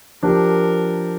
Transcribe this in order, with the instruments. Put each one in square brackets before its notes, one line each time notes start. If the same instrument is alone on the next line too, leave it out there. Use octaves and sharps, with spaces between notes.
[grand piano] F3 D4 G4 [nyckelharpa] A#4